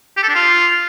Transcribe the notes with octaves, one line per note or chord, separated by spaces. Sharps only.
G4
A4
D4
F4